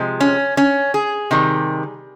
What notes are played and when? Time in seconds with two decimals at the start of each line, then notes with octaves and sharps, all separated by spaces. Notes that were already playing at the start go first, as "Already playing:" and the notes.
Already playing: C3 F3 G#3
0.21 C#4
0.57 C#4
0.94 G#4
1.31 C3 D#3 G3